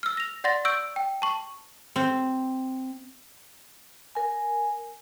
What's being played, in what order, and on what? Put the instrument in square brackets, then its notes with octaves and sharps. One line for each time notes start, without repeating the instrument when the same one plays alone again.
[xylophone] E6 F6
A#6 F7
D5 F#5 C6 A6 A#6
C#6 E6 G6 D7
G5
A5 C#6
[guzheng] C4
[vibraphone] A#4 G#5